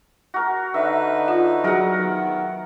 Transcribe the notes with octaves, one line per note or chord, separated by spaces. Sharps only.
F#4 A#4
D3 D#4 B4 E5
F4
F#3 F#4 G#4 A#4 F#5
D#3 B3